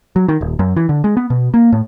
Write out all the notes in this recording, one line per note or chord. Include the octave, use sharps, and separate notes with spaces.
F#3
D#3
D#1
F#2
E3
D3
G#3
B3
B2
A#3
A2